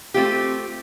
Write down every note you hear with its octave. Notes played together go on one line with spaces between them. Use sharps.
A3 C4 F4 G4